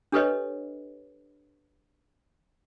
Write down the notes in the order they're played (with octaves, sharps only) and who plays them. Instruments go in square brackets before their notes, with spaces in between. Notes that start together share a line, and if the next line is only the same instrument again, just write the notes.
[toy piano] D4 G4 A4 B4 C#5 D#5